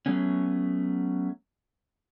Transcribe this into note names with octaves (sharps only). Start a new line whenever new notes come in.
F#3 A3 B3 C#4